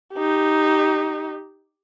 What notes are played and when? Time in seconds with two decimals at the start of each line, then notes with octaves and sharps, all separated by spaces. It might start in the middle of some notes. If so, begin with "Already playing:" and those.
0.14 D#4 G4